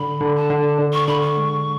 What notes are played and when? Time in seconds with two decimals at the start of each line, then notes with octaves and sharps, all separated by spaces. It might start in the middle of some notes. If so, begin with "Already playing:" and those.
Already playing: D3 B5
0.21 D3
0.35 A5
0.50 D3
0.78 D3
0.93 C#6
1.07 D3 B5
1.21 C#6
1.37 G#3